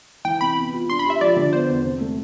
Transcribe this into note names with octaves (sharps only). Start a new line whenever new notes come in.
E3 G5
C3 B5
B3
F4
D4 C6
B5
G4
E5
F3 D5
D3
B3 C5
E2
C3
A3